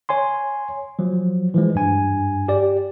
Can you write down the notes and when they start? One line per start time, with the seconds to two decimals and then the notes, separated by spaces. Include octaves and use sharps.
0.09 C#5 G#5 C6
0.99 F3 F#3
1.54 E3 F3 G#3
1.75 G2 G#5
2.48 G4 D5